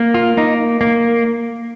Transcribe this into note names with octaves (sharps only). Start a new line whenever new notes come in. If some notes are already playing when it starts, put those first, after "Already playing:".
Already playing: A#3
F4
A#3 D#4
A#3